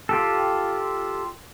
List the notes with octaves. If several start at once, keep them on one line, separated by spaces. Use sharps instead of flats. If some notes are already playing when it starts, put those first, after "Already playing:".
F4 G4 A4